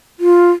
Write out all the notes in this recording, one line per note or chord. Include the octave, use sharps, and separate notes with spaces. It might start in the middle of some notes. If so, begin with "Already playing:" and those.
F4